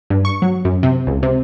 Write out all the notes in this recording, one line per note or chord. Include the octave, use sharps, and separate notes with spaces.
G2
C#6
F#3
F#2
C3
C#2
C3